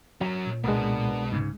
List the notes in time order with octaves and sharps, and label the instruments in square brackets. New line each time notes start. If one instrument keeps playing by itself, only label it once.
[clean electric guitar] F#3 [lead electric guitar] C#4 A#4
[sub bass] A#2
[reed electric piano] C2 G#3 [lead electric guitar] B2 [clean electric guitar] A#3 B3 D4
[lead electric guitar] B2
[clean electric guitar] G#2 C#3